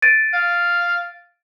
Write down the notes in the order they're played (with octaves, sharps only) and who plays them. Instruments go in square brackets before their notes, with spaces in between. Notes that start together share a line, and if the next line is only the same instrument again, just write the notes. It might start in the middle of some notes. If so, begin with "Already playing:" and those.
[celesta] A6 D7 D#7
[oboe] F5